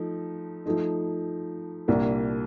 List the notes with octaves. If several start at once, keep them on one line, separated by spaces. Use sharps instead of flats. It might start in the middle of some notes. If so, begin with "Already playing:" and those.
Already playing: F3 A3 D#4
F3 A3 D#4
C2 A#2 G3 A#3 D4